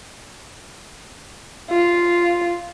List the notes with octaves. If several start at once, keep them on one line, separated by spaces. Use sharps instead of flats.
F4